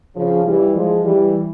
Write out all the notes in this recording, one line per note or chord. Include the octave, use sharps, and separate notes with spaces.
C#3 F3
E3 G3
F3 G#3
E3 G3